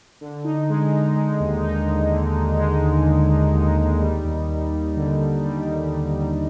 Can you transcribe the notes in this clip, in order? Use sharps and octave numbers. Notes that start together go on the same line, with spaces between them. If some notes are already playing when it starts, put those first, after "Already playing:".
D3
D#4
G#3
D#4
G#3
D#2
D#4
D#2
D3
D#2
G#3
D#2
D#2
D3
D#2
D#4
G3
D#2
D#2
D#2
D3
D3
G3
D#2
D3
G3